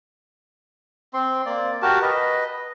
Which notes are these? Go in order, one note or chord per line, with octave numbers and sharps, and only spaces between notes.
C4 C6
A#3 D5
F#4 G4 A#4 A5
B4 D#5